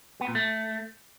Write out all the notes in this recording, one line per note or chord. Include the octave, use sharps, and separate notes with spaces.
B3
A#2
A3